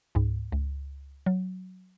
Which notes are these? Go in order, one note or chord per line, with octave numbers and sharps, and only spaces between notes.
C#2 G#2
C#2
F#3